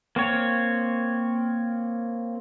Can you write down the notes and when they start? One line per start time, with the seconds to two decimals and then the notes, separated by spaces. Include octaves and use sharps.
0.16 A#3 C4 C#5